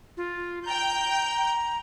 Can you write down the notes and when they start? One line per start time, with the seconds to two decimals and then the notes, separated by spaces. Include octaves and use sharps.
0.17 F4
0.66 G5 A#5 G6